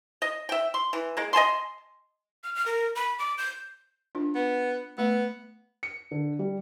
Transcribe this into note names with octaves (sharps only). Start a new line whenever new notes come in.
D#5
E5 G5
C6
E3
G#3 A#3
D#5 G#5 A5 C6
F6
F6
A#4
B5
D6
G6
D4 F4
B3
A3 B3
C#7
D3
G3